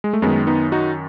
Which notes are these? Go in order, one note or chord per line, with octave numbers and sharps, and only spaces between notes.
G#3
A3
F#2 D#3 G#3 B3
B3 D#4
D#4 F#4